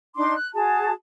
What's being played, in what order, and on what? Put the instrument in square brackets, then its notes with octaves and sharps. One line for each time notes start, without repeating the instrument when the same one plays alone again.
[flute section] D4 D#4 C6 D6
F#6
F#4 G#4 A5